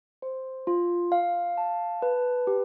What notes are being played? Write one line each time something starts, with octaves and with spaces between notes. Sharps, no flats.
C5
F4
F5
A5
B4
G4